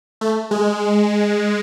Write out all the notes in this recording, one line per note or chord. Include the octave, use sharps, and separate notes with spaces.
A3
G#3